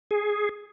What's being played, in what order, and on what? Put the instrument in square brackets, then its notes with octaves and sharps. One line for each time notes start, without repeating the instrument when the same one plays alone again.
[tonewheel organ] G#4